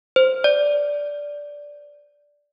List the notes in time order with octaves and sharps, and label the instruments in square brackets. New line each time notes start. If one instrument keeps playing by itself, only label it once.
[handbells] C5
D5